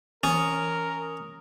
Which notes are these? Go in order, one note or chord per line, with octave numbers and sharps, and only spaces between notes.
E3 C#4 A#4 D#6